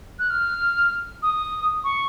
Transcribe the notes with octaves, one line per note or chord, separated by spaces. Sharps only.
F#6
F6
D#6
C#6